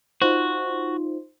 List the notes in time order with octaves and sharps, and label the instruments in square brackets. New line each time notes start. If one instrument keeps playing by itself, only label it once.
[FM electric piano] D#4 F4 C5 [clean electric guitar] F#4